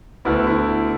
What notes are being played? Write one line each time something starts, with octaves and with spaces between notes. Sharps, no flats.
D2 D3 B3 E4
E4